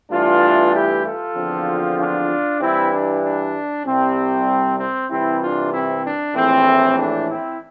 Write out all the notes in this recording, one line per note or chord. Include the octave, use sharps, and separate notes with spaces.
G2 E3 A3 D4 F4
E4 G4
F4 A4
E2 D3 F3 C4
D4 F4
G2 E3 G3 C4 E4
D4
D4
C2 C3 G3 C4
C4
C2 C3 E3 C4 E4
D4 F4
C4 E4
D4
A#1 A2 E3 A3 C4
D4
C4 E4